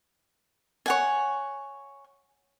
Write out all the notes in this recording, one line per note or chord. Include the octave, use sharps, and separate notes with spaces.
C#5 F#5 G#5